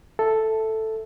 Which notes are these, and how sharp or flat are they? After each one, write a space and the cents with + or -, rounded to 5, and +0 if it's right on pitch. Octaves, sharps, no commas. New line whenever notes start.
A4 +0 E5 +0